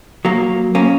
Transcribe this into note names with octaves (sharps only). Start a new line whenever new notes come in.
F#3 A#3
A#3 C#4